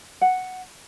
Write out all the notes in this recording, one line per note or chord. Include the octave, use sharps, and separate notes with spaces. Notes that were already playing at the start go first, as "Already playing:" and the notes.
F#5